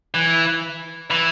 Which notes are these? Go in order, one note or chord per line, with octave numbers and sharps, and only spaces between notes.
E3
E3